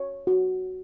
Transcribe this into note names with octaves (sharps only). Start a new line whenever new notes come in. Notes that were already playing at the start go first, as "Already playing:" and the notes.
Already playing: C#5
F#4